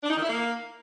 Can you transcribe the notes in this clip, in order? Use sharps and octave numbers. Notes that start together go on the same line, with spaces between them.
D4
D#4
D#3
E4
A#3